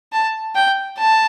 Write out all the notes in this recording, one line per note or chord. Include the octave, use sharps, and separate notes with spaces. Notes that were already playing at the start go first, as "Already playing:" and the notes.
A5
G5
A5